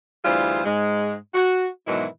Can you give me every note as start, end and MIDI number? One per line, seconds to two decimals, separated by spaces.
0.23 0.63 38
0.23 0.63 52
0.23 0.63 55
0.23 0.63 65
0.23 0.63 68
0.23 0.63 72
0.64 1.15 44
0.64 1.15 56
1.34 1.68 66
1.87 2.05 44
1.87 2.05 47
1.87 2.05 51
1.87 2.05 52
1.87 2.05 54
1.87 2.05 64